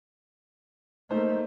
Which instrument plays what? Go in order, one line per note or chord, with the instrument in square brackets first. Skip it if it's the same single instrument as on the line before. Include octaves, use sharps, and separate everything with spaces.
[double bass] A3 A#3 [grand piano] D#4 C5